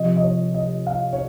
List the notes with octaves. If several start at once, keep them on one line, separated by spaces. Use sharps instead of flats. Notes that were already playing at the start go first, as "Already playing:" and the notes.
Already playing: C3 F3 D#5
D#5
C#5
D#5
F5
C#5